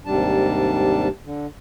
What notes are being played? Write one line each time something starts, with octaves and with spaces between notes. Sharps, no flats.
D#2 G#2 C3 G3 D4 A5
D3